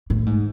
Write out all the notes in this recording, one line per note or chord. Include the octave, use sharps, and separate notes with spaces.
A2
G#2